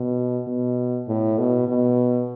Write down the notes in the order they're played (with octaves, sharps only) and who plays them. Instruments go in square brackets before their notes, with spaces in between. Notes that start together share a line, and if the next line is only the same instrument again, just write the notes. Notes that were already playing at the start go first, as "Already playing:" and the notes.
Already playing: [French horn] B2
B2
A2
B2
B2